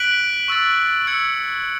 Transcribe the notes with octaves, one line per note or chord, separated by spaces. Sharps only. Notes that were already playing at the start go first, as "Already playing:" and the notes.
Already playing: F#6 B6 D7 F#7
C#6 E6 A6
E6 G#6 C#7